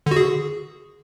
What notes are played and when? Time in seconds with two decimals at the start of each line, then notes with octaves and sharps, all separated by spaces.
0.06 D3
0.11 F#4
0.16 G#4